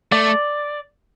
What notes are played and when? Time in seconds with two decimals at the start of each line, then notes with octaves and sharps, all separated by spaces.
0.12 A3 D5